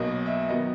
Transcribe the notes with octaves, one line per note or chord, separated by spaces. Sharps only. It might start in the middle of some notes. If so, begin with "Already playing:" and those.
Already playing: B1 B2 F#3 A#3 D#5
E5
D#3 F#3 B3 D#5